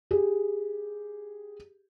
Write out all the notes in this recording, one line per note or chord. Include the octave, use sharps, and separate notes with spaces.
G4 G#4